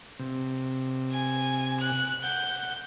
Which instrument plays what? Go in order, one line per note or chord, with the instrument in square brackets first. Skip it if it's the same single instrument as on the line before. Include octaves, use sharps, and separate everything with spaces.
[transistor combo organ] C3
[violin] G#5
F#6
[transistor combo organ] F#5 [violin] G6